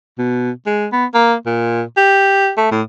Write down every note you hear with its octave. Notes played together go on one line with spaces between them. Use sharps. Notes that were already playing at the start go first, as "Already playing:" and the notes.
B2
G#3
B3
A#3
A#2
G4
A3
A2